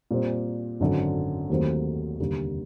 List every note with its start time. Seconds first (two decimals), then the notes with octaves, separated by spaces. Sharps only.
0.11 A#2 G3 C4
0.80 G#1 F#2 D3
1.50 D#2 D#3 F#3 A3 C4
2.19 F1 D#2 D3 G3